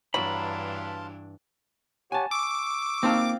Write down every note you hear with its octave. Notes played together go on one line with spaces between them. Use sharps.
G2 E3 F#3 D4 F5 A5 B5 C6
G4 C#5 F#5 G#5 A5
C#6 D6 E6
A#3 C4 D#4 F4 A5